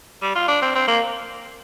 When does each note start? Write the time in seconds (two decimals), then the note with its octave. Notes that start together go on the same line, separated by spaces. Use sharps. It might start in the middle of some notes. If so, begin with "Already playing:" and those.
0.22 G3
0.36 F4
0.48 D4
0.62 C4
0.75 C4
0.88 A#3